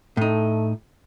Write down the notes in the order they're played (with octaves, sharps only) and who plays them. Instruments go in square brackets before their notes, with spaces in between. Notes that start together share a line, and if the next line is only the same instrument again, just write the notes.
[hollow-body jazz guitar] A2 D#4 [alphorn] A3